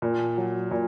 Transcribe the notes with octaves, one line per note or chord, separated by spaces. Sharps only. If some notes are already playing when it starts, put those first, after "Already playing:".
A#2
F#3
A#2